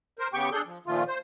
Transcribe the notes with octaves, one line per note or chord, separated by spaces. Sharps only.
A#4 C5
C#3 B3 G4 G5 C#6
D4 G#4 A4 G6
F3
A#2 D#3 F3 A3 F4
C5